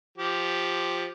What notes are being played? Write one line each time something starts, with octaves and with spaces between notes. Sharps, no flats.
F3 G4